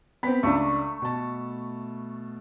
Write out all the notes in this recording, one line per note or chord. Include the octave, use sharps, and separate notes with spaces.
B3 C4 B5
C#2 A3 D4
B2 A5